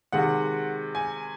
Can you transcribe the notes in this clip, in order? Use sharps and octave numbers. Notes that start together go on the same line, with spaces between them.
C3 D#3 G#3 F#5
G#5